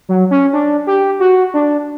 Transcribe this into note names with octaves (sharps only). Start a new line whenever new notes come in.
F#3
C#4
D4
G4
F#4
D4